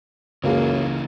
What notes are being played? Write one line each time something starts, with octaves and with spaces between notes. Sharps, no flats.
C#2 F#2 C#3 E3 A#3 G#4